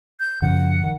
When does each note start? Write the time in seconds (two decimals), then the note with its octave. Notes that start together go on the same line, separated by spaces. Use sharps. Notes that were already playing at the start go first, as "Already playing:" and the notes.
0.20 G6
0.42 F#2 C#3 F3 F#5
0.83 D#3